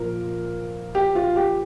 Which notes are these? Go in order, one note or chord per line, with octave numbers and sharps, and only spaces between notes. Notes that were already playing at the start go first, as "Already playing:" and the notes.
Already playing: A#2 F3 A#4
G4
F4
G4